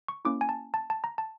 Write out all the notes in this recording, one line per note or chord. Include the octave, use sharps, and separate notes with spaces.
C#6
A#3 C#4 E4 D6
G#5
A5
A5
A5
A#5
A5